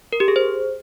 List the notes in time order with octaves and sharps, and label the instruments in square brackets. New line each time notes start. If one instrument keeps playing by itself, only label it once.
[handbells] A#4
G4
G#4
C5